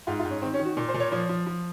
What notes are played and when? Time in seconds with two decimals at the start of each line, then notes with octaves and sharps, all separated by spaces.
0.07 G#2 F4
0.19 F4
0.25 G#2
0.30 C#4
0.42 D#3 C4
0.53 C#4
0.59 D#3
0.65 F#4
0.77 A#2
0.89 C5
0.94 A#2
1.00 C#5
1.12 F3 C#5
1.29 F3
1.46 F3